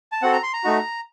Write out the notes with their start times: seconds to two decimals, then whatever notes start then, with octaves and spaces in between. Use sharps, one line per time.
0.12 A5
0.22 C4 F#4 A4 F#5
0.33 A#5
0.43 C6
0.54 A#5
0.64 A3 D#4 F#4